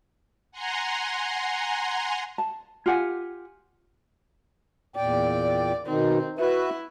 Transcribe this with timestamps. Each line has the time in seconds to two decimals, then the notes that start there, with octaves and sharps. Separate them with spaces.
0.51 F#5 G#5 A#5 C6
2.38 A5
2.86 F4 G4 F#5 G#5
4.96 E2 A#2 D5 G5
5.87 B2 D#3 C4 D#4
6.39 E4 F#4 B4 E5